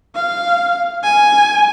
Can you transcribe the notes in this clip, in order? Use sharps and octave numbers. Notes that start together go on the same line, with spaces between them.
F5
G#5